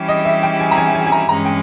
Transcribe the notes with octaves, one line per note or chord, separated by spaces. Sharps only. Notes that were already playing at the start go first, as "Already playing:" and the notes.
Already playing: E3 G3 C#4 E4 G4
D#5
E5
G5
G#5
A#5
G#5
G#5
G#5
A#5
G2 E3 G#3 C#4 A#5
G5